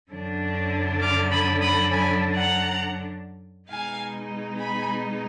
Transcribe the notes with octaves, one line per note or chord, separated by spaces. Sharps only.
F#2 D3 F#3 D4
D6 F6
B5 D#6
B5 D#6
G#5 B5
F#5 A#5
B2 G#3 D#4 F5 G#5
G#5 B5